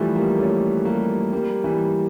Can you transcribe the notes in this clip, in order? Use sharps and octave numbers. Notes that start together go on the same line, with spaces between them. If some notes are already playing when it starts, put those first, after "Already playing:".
Already playing: E3 F3 G3 A3
G3 A#3
A3 C#4
G3 A#3
G3 A#3
E3 G3